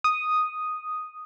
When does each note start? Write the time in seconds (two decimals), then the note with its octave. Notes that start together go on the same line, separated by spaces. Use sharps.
0.04 D#6